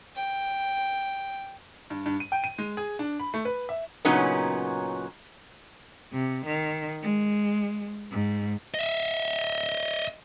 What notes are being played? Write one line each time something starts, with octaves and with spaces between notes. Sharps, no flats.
G5
G2
G2
D#7
G5
D#7
G#3
G#4
D4
B5
A3
B4
E5
A#2 C#3 F#3 B3 C#4 D#4
C3
D#3
G#3
G#2
D#5 E5